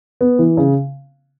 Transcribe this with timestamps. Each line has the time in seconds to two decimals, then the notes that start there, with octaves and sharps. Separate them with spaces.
0.21 B3
0.39 E3
0.57 C#3